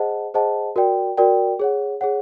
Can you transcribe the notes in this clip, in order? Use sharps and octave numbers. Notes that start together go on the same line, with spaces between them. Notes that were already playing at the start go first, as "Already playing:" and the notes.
Already playing: G#4 C5 D#5 F#5 A5
G#4 C5 D#5 F#5 A5
F#4 A#4 D5 G5
F#4 A#4 D5 G5
G#4 C#5 F#5
G#4 C#5 F#5